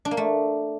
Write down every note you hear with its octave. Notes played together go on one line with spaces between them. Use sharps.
D4
A#3
A3